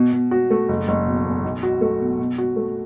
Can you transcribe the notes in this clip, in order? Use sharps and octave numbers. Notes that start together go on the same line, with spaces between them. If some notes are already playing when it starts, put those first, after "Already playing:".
Already playing: B2
B2
F#4
A3
F#1
F#1
B2
E2
B1
F#4
A3
B2
B2
F#4
A3